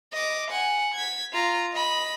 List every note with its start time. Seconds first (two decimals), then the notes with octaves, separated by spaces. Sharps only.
0.13 D#5 D6
0.51 F#5 G#5
0.94 G#6 B6
1.33 F4 A#5
1.72 D#5 B5